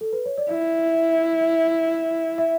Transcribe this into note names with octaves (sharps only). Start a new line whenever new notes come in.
A4
B4
C#5
D5
E4 E5
E5